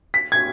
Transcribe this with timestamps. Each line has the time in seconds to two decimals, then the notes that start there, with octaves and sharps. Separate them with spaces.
0.14 B6
0.32 G#6